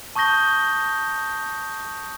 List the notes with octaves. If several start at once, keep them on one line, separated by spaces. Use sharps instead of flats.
A5 C#6 D#6 G6 A#6 G7